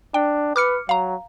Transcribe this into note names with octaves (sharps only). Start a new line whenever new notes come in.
D4 G5
B4 D6 F6 C#7
F#3 F5 A#5